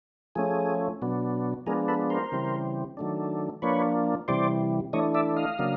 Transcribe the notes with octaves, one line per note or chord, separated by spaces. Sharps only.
F3 A3 C#4 G#4
B2 F#3 B3 D4
F3 G#3 B3 D4 G#4 A#4
A4 B4
A#4 C5
C#3 E3 G3 C4
D#3 F#3 A3 D4
F3 A#3 D4 B4 C#5
C3 E3 G3 C5 D5
E3 A3 D4 C#5 D#5
D5 E5
D#5 F5
C#3 F#3 A#3 D4